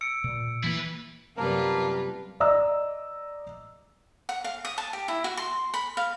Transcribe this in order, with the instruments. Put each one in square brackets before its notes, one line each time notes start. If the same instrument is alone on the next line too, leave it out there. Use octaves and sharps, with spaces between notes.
[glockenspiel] E6 C#7 D7
[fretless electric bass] A#2
[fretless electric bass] E3 A#3 [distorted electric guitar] E4 B4
[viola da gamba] F#2 C3 G3 [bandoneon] A#3 A#4 [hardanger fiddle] F4 B4 [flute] A5
[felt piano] D5 D#5 A#5 E6
[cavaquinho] F#5
F5
D#6
A5
G4
E4
F#4
C6
B5
F5